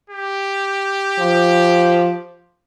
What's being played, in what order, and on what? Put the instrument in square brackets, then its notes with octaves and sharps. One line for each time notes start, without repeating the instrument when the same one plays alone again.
[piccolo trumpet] G4
[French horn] F3